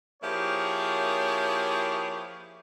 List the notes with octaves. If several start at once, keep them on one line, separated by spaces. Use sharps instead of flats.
F3 A#3 E4 G4 G#4 C#5